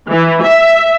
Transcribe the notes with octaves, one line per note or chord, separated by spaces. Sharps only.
E3
E5